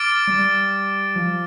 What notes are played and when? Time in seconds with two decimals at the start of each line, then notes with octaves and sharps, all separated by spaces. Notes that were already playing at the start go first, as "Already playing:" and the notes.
Already playing: D6 F6 A6 D7
0.27 G3
1.15 F3